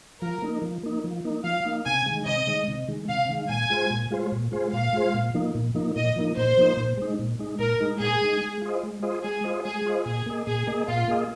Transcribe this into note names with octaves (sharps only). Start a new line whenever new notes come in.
F3 A#4
A#3 D#4
F3
A#3 D#4
F3
A#3 D#4
F3 F5
A#3 D#4
C3 G#5
D#3 G#3
C3 D#5
D#3 G#3
C3
D#3 G#3
C3 F5
D#3 G#3
A#2 G#5
G#3 F4 G#4 C5
A#2
G#3 F4 G#4 C5
A#2
G#3 F4 G#4 C5
A#2 F5
G#3 F4 G#4 C5
A#2
F3 A#3 D#4
A#2
F3 A#3 D#4
A#2 D#5
F3 A#3 D#4
A#2 C5
F3 A#3 D#4
A#2
G#3 D#4
A#2
G#3 D#4
A#2 A#4
G#3 D#4
A#2 G#4
G#3 D#4
G#3
F4 G#4 C5 D#5
G#3
F4 G#4 C5 D#5
G#3 G#4
F4 G#4 C5 D#5
G#3 G#4
F4 G#4 C5 D#5
A#2 G#4
A#3 G#4 D#5
A#2 G#4
A#3 G#4 D#5
A#2 F4
A#3 G#4 D#5